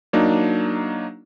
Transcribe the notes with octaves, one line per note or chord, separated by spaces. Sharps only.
F#3 A#3 D4 D#4